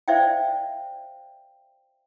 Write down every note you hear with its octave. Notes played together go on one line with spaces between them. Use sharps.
C5 D5 E5 F5 G5